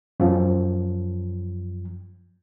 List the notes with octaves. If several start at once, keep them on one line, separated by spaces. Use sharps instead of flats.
F#2 F3